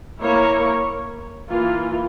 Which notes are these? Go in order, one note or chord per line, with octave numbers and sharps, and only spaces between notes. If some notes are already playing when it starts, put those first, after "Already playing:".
A#3 E4 A#4 C#5
E3 A#3 F4